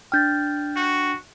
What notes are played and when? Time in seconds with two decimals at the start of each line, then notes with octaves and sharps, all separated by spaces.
0.12 D4 G5 F6 G6 A6
0.76 F#4